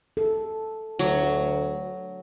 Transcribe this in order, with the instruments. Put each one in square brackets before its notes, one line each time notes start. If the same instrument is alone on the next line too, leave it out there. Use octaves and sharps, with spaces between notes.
[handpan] A4
[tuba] D2 [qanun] F#3